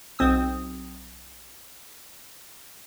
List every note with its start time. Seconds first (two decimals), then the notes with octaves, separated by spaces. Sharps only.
0.19 B1 C4 D#6